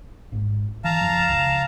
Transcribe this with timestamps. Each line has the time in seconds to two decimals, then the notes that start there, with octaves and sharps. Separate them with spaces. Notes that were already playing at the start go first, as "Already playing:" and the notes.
0.32 G#1 G#2
0.85 E3 F5 A5 A#5
1.01 F#1 F3
1.29 C#2